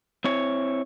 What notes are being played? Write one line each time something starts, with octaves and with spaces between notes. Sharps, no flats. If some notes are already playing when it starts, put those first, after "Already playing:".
C4 E4 C#5